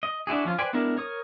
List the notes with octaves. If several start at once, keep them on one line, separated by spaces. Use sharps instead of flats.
D#5
D4 E4 F#4 G#4
F3 C#4 F4
B4 C5 D5 G5 G#5
G#3 B3 D4 E4 A#4
A#4 C#5 D#6